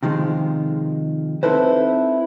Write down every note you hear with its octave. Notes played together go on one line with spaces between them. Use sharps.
C3 D#3 F3 G#3
C4 D#4 E4 A4 B4 C5